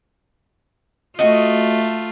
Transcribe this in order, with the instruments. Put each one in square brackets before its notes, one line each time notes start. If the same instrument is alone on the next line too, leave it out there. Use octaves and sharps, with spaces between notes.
[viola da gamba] A3 F4 [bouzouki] F#4 D#5